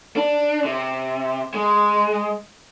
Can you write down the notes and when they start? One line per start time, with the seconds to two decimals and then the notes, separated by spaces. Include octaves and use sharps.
0.16 D4
0.65 C3
1.54 G#3